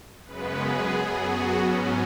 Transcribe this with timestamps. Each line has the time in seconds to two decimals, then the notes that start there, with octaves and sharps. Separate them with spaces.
0.25 F#2 C#3 G#3 B3 B4
0.58 G#4
0.90 F#2 F#3 B3
1.23 F#4
1.56 G#2 F#3 B3 C#4